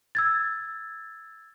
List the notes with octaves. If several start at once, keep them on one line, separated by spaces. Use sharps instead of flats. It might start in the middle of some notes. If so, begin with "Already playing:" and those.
E6 G#6 A6